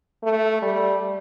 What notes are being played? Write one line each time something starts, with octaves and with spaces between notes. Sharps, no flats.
A3
G3